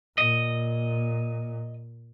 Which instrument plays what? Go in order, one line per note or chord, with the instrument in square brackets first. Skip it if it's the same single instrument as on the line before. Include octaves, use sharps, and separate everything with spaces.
[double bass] A#2 [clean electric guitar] D#5